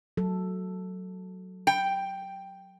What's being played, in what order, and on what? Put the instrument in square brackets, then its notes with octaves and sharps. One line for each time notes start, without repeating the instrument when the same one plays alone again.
[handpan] F#3 A4
[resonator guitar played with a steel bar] G5